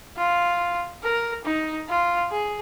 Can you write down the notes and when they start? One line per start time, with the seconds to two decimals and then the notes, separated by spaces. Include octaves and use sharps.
0.17 F4
1.03 A#4
1.45 D#4
1.89 F4
2.31 G#4